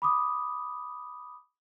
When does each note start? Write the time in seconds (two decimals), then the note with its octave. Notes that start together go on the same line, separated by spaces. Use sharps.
0.02 B5 D6 D#6